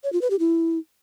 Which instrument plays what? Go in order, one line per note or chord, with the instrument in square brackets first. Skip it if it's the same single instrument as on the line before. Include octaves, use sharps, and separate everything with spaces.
[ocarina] C#5
F4
B4
G4
E4